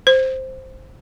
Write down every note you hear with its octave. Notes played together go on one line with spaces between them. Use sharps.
C5